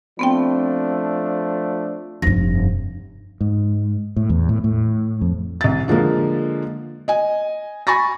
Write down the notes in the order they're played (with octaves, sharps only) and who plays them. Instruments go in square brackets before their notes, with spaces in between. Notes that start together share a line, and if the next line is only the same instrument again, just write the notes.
[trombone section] F3 A3 D4 [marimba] B3 C4 G5
[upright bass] F1 G2 [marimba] A#6
[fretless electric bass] G#2
A2
E2
A2
A2
F2
[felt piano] C2 A6
D3 F3 G#3 A#3
D#5 G#5
G#5 B5 C#6 A6 A#6